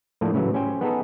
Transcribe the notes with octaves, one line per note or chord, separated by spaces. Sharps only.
A2 F3 A3 A#3 D4
A2 C#3 E3 F#3
C#4 G4 C5 G5 G#5
B3 D#4 G#4 A4